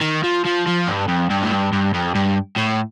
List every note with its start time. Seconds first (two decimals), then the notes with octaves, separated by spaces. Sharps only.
0.02 D#3
0.23 F3
0.45 F3
0.66 F3
0.87 G2
1.08 F2
1.30 G2
1.43 A2
1.51 G2
1.73 G2
1.94 F2
2.15 G2
2.57 A2